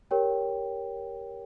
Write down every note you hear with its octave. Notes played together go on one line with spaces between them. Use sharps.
G4 A#4 C#5 G5